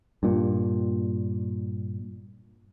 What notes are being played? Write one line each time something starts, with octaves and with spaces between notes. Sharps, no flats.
G2 A#2